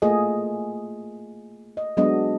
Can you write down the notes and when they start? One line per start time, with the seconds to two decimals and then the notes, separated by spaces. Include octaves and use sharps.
0.02 A3 A#3 F4 G#4 D#5
1.77 D#5
1.97 F#3 G#3 B3 D4 D#5